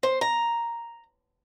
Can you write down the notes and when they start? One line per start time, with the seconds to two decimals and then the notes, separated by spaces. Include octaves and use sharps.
0.03 C5
0.21 A#5